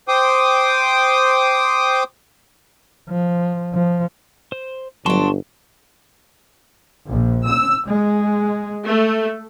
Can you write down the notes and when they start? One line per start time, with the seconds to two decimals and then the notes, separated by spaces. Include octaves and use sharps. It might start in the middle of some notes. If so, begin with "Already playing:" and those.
0.08 C5 G5 D6 D#6
3.09 F3
3.74 F3
4.52 C5
5.06 G1 F#3 D4 A5 C6 C#6
7.10 A#1
7.45 E6
7.85 G#3
8.86 A3